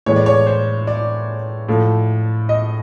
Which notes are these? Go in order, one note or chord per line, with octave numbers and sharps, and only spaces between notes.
A2 E3 G#3 C#5
D5
C#5
C5
D5
A2 F3 A3
D#5